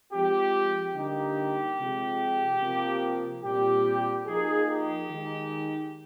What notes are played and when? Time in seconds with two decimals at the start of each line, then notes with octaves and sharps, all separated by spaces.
0.12 F3 G#3 C4 G4
0.95 D3 G3 A#3 D#4 G4
1.78 C3 F3 G#3
2.60 C3 F3 A#3
3.44 A#2 G3 C4 G4
4.26 F3 A#3 D#4 G#4
4.67 G4
5.09 D#3 G#3 D#4